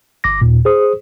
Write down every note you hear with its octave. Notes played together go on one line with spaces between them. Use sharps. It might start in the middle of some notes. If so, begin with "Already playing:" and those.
G1 D6 A#6
D#2 A#2
G#4 C5 D#6